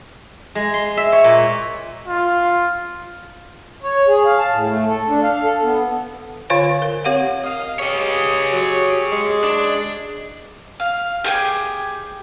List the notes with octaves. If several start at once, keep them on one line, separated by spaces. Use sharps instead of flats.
G#3
C6
E5
C#5
A#2
F4
C#5
G#4
F5
A5
A2
A3
A4
D4
F5
A4
B3
D3 F4 C5 C#5 F5 G#5
A#4
C4 G4 C#5 F5 F#5
A#4 D#5 F5
G4 G#4 C#5 D#5
F#3
G#3
D4
F5
G4 G#4 G5